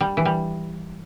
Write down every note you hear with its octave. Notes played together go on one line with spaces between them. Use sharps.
G3
E3
G3